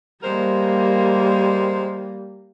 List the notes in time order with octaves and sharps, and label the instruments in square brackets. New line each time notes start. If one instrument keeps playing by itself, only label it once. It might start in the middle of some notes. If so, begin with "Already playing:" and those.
[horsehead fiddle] G3 A#3 [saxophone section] G#3 A#4 C5